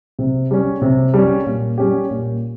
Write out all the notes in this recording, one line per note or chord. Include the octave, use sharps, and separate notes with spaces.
C3
G3 C#4
C3
G3 C#4
A#2
G3 C#4 G4
A#2